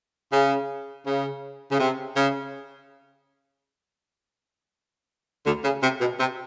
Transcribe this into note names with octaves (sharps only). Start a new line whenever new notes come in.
C#3
C#3
C#3
C3
C#3
D2 D3
C#3
C3
B2
C3